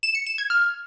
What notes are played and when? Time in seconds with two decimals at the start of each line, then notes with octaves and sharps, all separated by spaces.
0.03 E7
0.15 C#7
0.27 E7
0.38 G#6
0.50 F6